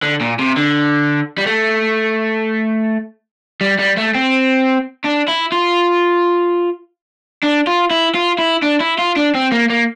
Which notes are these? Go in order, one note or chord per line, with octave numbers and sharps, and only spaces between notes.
D3
A#2
C3
D3
G3
A3
G3
G3
A3
C4
D4
E4
F4
D4
F4
E4
F4
E4
D4
E4
F4
D4
C4
A#3
A#3